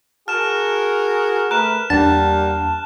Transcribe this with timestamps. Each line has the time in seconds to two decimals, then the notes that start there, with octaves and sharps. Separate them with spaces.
0.28 F#4 G#4 A#4 A5 F6 E7
1.51 A3 A#4 B4 F#6 E7
1.90 E2 G3 A#3 D4 F#5 A5